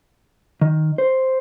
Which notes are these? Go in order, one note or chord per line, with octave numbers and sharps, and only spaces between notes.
D#3
C5